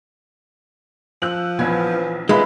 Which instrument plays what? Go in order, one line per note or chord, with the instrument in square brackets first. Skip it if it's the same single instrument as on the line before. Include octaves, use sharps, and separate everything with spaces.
[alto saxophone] F3 [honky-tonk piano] E6 F#6 F#7
[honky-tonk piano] A#1 G#6 [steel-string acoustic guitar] E3 B3 C#4
[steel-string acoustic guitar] D#3 C#4 [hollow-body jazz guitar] G#3 [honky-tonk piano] F4 B4 E5